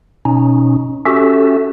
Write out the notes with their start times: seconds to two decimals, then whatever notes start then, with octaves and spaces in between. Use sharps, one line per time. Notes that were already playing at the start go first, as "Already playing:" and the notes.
0.25 B2 C#4 D#4
1.06 C#4 F#4 G4 A4 E5